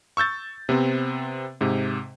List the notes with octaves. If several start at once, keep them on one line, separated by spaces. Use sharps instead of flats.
C#6 E6 G6 A6
C3 B3 C4
G#2 C3